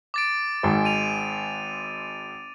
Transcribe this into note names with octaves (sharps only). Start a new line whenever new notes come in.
D6 A6 D7
G#1 G#2
D#7 F7